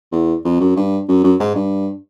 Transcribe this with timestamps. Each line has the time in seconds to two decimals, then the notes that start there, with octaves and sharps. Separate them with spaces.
0.12 E2
0.45 F2
0.60 F#2
0.76 G2
1.08 F#2
1.24 F#2
1.40 G#2
1.55 G2